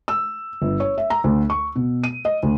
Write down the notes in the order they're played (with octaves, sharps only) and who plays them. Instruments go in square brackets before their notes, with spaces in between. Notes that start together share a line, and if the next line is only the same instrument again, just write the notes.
[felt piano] E6
G1
C#5
E5
A#5
D2
C#6
B2
D#7
D#5
D2